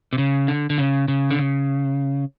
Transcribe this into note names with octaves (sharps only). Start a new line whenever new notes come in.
C3
C#3
D3
D3
C#3
C#3
D3
C#3